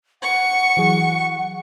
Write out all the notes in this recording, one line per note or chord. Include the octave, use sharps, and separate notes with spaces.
F#5 C#6
E3 F#3 G#4